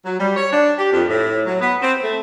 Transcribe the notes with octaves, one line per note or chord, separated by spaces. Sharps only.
F#3
G3
C#5
D4
G4
F2
A2
F#3
B3
C4
A3